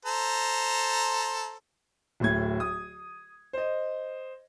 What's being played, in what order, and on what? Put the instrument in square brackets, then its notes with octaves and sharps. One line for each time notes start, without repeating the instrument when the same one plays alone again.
[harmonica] A4 C5 A#5
[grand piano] D1 A2 G#6
D#6
C5 D#5